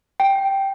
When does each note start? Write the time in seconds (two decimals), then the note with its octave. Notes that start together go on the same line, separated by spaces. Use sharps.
0.20 G5